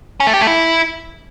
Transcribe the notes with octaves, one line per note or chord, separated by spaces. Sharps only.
C#4
A3
G4
A3
E4